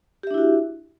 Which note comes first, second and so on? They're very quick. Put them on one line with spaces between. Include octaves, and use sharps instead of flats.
G4 E5 D4 E4 F#4